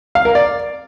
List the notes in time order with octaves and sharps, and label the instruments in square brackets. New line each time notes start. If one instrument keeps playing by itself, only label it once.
[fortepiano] F5
A#4
D5